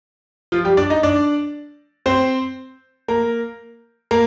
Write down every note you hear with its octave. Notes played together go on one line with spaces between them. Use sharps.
F3 F4
G3 G4
D4 D5
D#4 D#5
D4 D5
C4 C5
A#3 A#4
A#3 A#4